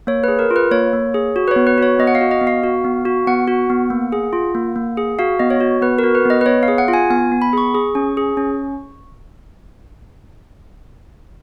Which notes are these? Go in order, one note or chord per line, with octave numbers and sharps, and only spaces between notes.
A#3 C#5
G#4 B4
A#4
F4
B4
A#3 C#5
A#3
G#4
F#4
B4
B3 C#5
B4
F#4 C#5
B3 D#5
F#5
F5
F#4
D#5
B3
F5
F#4
B3
F#4
B3 F#5
F#4
B3
A#3
G#4
F4
A#3
A#3
G#4
F#4 F5
B3 D#5
C#5
F#4
B3 B4
F#4 A#4
B4
B3 D#5
B4
B3 C#5
F5
G#4
F#5
F4
G#5
B3 G#5
B3
B5
G#4 C#6
G#4
C#4
G#4
C#4